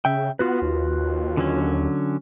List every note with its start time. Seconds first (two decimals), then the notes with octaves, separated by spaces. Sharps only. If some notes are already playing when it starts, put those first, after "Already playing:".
0.05 C#3 E5 G5
0.39 B3 F4 F#4 B4
0.62 D#2
1.37 D3 F#3 C#4